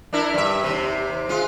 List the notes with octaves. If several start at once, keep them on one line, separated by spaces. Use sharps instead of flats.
D4 E4 A#4
G2 E5
D#2 C3
G#3 F4